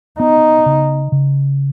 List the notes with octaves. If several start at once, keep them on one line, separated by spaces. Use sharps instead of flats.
B3 D#4
C#3
C#3